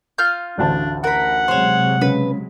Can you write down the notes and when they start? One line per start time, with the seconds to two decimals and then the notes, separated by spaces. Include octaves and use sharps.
0.18 F4 F6 G6
0.58 A1 D2 D4 A5
1.04 A#4 F#5 B5
1.48 C3 F#3 G#3 C5 C#5
2.01 C#3 B4